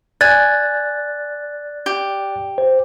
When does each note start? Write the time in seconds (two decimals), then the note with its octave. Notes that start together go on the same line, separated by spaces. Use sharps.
0.21 D5 G#5 F#6 A6
1.86 G4
2.58 C5